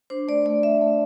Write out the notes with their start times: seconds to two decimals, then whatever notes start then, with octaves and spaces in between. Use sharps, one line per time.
0.10 D4 C5
0.28 A3 D5
0.46 A3 D5
0.63 A3 E5
0.81 A3